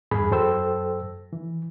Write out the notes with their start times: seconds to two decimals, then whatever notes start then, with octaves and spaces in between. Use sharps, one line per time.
0.11 E2 G2 G#4 B5
0.31 F#2 F#3 A4 C5 G5 E6
1.33 E3